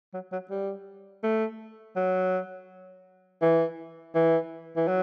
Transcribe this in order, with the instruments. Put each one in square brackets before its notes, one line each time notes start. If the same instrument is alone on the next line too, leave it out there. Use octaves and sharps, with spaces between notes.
[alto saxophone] F#3
F#3
G3
A3
F#3
E3
E3
E3
F#3